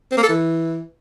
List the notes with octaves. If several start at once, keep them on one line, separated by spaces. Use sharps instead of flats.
C4
A#3
A4
E3